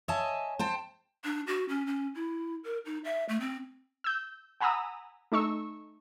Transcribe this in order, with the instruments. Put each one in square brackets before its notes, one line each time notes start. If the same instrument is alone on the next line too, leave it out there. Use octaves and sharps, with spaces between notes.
[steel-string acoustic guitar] C#5 D#5 E5 G#5 A5
C5 G5 A5
[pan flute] D4
F#4
C#4
C#4
E4
A#4
D#4
E5
A3
C4
[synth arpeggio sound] E6 G6
F#5 G#5 A#5 B5 D#6 E6
A3 D#4 C#6 E6